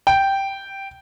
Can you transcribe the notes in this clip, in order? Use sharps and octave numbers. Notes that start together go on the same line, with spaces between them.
G5